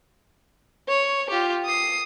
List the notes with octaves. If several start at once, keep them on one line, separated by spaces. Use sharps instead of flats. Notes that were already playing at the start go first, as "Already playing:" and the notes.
C#5
F4 G4
D#6 C7